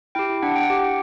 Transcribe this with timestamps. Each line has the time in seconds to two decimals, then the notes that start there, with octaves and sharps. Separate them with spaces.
0.15 E4 G4 G5
0.43 D4 F#5
0.55 G5
0.61 F#5
0.70 G4
0.78 G5